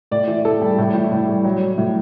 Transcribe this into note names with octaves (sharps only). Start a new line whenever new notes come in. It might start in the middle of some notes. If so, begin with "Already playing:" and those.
A2 D5
E3
A2 A4
G3
A2
E3
A2
G3
F#3
F#3
A2